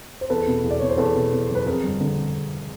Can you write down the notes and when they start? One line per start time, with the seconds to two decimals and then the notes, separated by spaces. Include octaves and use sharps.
0.21 C5
0.30 E2 A4 B4
0.47 B2
0.64 E2
0.71 D5
0.80 E2 C#5
0.89 C5
0.98 E2 A4 B4
1.16 B2
1.32 E2
1.49 F#1
1.55 B4
1.66 F2 G#4 A#4
1.83 G1
2.01 D3